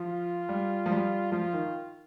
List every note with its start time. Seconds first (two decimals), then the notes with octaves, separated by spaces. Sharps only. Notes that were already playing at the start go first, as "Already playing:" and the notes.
Already playing: F3 F4
0.49 G3
0.86 F3
0.91 G3
1.32 F3 F4
1.53 D#3